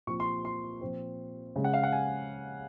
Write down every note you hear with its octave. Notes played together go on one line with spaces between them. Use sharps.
A#2 F3 C4 C#6
C6
C6
A#2 F3 C4
C#3 G#3 C#4
F#5
F5
F#5
G#5